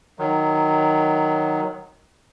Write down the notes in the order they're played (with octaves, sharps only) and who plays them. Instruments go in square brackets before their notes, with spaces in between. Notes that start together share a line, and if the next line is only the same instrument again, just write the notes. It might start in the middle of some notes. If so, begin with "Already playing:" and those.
[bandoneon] D#3 F#3